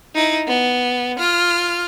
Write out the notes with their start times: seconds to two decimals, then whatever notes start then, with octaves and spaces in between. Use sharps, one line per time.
0.15 D#4 E4
0.47 B3
1.19 F4 F6